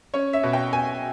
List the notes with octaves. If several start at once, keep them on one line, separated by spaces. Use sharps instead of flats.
C#4 C#5
E5
B2
G5
B2 G#5